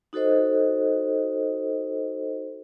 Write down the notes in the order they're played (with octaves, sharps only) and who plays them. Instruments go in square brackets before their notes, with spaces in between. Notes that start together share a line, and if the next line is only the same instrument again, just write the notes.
[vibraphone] D#4 F#4 A4 C5 D#5